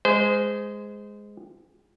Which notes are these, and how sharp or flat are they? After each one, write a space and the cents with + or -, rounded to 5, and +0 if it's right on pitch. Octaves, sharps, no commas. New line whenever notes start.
G#3 +0 C5 -25